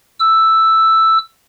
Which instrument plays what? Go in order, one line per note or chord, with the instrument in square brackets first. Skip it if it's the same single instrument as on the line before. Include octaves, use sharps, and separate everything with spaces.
[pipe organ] E6